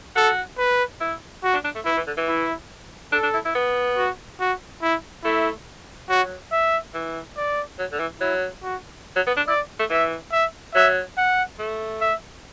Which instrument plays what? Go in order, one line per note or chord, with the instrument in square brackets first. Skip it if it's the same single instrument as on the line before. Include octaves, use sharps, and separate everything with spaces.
[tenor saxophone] F#4 [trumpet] A4
[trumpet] B4
[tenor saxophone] E4
[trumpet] F#4
[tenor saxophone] D4
D4
A3
[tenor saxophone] E3 [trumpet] E4
[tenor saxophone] E3
D3
E3
[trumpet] E4
[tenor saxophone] D4 [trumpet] A4
[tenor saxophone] D4
E4
E4
B3
[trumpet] F#4
F#4
E4
[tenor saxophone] A3 [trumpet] E4
[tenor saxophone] F#3 [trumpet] F#4
[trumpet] E5
[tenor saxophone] E3
[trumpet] D5
[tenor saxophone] F#3
D3
E3
[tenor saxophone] F#3 [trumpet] E4
[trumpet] F#4
[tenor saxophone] F#3
B3
D4
[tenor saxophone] E4 [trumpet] D5
[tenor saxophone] A3
[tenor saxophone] E3 [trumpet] E5
[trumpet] E5
[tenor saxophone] F#3 [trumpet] E5
[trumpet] F#5
[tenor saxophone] A3
[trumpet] E5